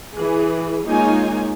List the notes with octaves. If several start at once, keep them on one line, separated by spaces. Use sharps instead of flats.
E3 G#4
G#3 A#3 D#4 F4 C#5 G#5